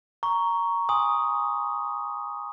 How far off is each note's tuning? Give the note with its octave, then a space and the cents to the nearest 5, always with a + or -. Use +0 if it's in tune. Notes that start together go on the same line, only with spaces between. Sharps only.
A#5 +0 C#6 +10
G#5 -15 C6 +0 D#6 +0